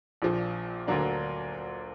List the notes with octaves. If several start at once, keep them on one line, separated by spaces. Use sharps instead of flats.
A#1 A#2 F3
D2 D3 F#3 A#3 D4